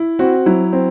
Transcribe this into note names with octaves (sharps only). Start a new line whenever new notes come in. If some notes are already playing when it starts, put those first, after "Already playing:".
Already playing: E4
C4 F#4
F#3 E4
C4